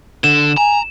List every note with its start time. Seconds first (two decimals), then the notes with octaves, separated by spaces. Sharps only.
0.24 D3 E7
0.57 G#5 A#5